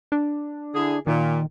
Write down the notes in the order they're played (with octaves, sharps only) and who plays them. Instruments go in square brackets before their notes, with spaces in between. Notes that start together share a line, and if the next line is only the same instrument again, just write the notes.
[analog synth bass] D4
[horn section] D3 E4 G#4
[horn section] A#2 [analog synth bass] D#3